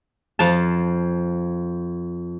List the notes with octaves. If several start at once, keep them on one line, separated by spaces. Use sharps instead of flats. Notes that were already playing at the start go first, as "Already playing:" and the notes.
F2 F5 A5